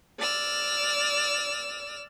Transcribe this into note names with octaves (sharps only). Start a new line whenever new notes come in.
D5 E6 F6